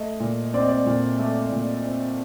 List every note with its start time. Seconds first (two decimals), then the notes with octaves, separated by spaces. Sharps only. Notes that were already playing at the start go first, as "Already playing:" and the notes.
Already playing: A3 D#5
0.20 A#2
0.54 C4 D5
0.61 D#5
0.69 D5
0.86 A#2
1.19 A3
1.52 A#2
1.85 C4